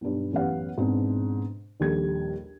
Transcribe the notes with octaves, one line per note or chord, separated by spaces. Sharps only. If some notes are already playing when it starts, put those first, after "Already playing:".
B1 G2
A1 F#2 B3 G4 F5 F#5
G#2 B2 B3 C4 D4
A#1 D#2 G3 A4 G#6